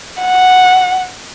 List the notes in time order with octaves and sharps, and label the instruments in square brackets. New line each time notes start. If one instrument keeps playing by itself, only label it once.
[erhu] F#5